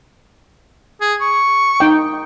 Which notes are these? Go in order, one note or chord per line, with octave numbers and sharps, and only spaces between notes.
G#4
C#6
D#4 G5